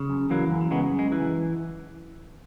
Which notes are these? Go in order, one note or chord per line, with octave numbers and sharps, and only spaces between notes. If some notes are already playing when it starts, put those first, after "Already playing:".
Already playing: C#3
F#2
E3 F#3 A#3
F#2
C#3 G#3 B3
F#2
G#3
E3